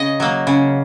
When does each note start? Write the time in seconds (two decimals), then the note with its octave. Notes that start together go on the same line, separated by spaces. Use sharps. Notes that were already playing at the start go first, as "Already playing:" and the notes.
Already playing: C#3 D#5
0.20 F#3 A#3
0.47 C#3